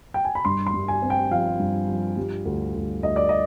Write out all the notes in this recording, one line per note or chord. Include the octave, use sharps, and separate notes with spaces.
G5
G#5
B5
G2 C6
C6
G2
G#5
C4
G5
F3 F5
G2
F3
G3
D2
D2
D2 D#5
D5
D#5